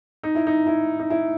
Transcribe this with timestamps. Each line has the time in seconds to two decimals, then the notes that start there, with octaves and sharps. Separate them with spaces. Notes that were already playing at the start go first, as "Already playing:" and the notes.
0.23 D#4
0.35 E4
0.47 D#4
0.67 E4
0.99 D#4
1.10 E4